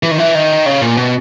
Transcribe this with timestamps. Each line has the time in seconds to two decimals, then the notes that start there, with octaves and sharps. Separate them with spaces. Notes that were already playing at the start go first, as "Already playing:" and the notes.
0.03 E3
0.11 D#3
0.18 E3
0.35 D#3
0.66 C#3
0.82 A#2
0.97 B2